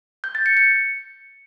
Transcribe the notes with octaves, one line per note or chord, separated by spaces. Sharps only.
G6
A6
C#7
C#7